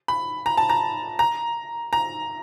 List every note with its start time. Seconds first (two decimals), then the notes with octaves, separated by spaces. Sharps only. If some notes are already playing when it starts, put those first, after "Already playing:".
0.08 B5
0.46 A#5
0.57 A5
0.70 A#5
1.19 A#5
1.93 A#5